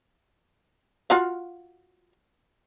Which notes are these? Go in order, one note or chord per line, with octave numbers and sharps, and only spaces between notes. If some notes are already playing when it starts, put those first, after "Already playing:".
F4 F#4 F5